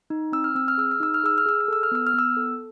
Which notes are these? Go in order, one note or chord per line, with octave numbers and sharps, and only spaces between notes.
D#4
C4 E6
F6
C4 E6
F6
G#4 E6
F6
D#4 E6
F6
G#4 E6
F6
G#4 E6
F6
A4 E6
F6
B3 E6
F6
B3 E6
A4